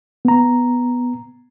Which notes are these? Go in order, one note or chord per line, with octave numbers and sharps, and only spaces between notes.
B3 A#5